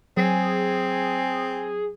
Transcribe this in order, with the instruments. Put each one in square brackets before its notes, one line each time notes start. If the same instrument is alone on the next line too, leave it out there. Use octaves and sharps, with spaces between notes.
[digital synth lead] F#3 [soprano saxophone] C4 [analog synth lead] G#4